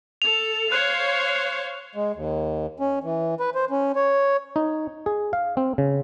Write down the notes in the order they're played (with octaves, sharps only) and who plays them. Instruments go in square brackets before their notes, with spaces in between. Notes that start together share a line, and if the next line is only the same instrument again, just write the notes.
[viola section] A4 [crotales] F7
[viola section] C5 C#5 F5 [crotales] F#6
[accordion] G#3
D#2
C#4
E3
B4
C5
C#4
C#5
[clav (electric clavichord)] D#4
G#4
F5
C4
C#3